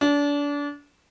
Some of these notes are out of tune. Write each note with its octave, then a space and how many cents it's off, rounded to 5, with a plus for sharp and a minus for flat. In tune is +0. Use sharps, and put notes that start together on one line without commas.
D4 -30